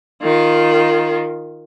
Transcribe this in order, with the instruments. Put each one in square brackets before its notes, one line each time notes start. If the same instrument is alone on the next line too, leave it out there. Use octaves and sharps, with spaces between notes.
[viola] D#3 F4